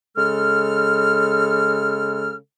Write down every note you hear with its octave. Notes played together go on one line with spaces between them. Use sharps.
C#3 G#3 A4 F6